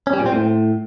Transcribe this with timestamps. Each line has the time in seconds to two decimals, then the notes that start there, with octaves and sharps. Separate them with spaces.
0.07 C#4
0.13 G3
0.20 A#2
0.26 C4
0.32 A2